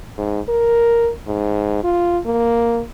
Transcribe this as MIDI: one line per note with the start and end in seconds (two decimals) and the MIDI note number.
0.18 0.41 44
0.49 1.10 70
1.27 1.80 44
1.84 2.19 65
2.26 2.81 58